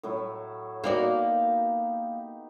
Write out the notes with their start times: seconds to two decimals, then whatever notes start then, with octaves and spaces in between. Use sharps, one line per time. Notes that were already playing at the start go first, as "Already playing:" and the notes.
0.03 A2 F#3 E4
0.84 A#3 B3 D#4 F#4 G4 D5